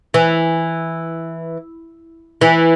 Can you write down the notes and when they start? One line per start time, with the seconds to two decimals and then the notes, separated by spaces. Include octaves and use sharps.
0.14 E3
2.41 E3